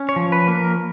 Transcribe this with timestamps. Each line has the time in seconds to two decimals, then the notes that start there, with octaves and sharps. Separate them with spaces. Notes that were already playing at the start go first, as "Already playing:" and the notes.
Already playing: C#4
0.09 C#5
0.16 F3
0.32 B4
0.48 A#3
0.55 A#4